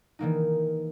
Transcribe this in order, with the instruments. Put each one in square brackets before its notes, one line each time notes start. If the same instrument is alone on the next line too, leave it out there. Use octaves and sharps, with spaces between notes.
[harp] D#3 E3 A#3 D#4